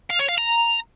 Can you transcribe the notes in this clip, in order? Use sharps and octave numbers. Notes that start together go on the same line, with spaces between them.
F5
C#5
F5
A#5